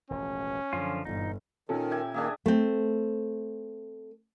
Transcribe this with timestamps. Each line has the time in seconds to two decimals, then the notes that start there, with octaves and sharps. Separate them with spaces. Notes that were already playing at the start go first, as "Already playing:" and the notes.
0.10 E1 A1 F3 C#4
0.73 F#2 D3 F3 F4
1.05 G1 A#2 E3 D#4
1.69 A#2 D#3 C#4 A4
1.91 G4 E5 G#5
2.14 D#3 A#3 D4 G#4 E5
2.46 A3 C4